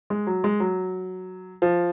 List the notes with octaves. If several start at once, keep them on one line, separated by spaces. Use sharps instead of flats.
G#3
F#3
G#3
F#3
F3